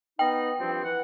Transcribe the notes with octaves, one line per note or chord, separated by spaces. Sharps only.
B3 D#4 D#5 G5
G2 F3 C4
E3 F#5